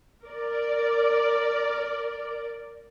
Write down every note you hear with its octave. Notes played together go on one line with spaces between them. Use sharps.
A#4 D5